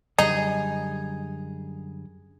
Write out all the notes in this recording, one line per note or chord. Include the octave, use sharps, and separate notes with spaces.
F#2 D3 G3 D#4 G#4